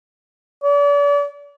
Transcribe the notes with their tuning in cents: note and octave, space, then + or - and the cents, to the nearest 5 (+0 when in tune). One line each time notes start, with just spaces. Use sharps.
D5 -40